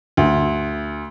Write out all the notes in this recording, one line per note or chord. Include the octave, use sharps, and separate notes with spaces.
D2